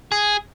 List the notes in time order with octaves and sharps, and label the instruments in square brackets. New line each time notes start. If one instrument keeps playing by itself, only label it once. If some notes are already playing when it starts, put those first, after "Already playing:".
[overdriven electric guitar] G#4